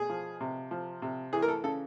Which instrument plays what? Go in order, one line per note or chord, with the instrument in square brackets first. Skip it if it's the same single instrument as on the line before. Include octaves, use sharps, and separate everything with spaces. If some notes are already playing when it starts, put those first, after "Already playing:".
Already playing: [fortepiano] B2 G#4
F3
C3
F3
C3
E3 G#4
A#4
A4
C#3 A4